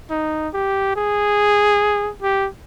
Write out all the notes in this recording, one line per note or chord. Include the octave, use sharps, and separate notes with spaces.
D#4
G4
G#4
G4